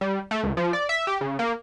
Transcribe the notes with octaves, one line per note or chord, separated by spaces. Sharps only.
G3
A3
C#2
F3
D5
E5
G4
C#3
A#3